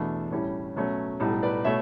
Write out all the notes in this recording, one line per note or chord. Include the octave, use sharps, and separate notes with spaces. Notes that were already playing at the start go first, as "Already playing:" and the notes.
Already playing: E2 B2 A3 D4
A2 G3 C#4 E4
B2 F#3 A3 C#4
B1 A2 G3
B4 D5
B2 A3 C#5 E5